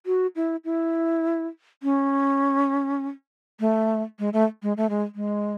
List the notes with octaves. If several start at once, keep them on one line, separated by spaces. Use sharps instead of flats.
F#4
E4
E4
C#4
A3
G#3
A3
G#3
A3
G#3
G#3